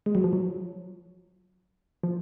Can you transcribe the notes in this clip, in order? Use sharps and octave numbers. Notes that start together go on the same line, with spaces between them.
G#3
F#3
F3
F#3
F3